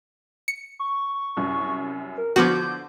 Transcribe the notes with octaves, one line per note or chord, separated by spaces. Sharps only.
C#7
C#6
C2 F#2
A#4
D3 F3 B3 F#4 D6 G6 G#6